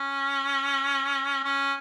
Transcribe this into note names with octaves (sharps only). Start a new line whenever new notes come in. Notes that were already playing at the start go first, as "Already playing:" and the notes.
Already playing: C#4
C#4